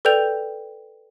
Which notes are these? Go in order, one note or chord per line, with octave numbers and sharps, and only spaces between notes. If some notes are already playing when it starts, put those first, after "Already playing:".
A4 B4 D5 G5 G6 F7